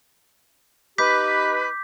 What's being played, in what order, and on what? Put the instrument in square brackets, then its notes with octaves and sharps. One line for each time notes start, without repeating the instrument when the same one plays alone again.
[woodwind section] D#4 G4 B4 [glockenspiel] D6 G6 B6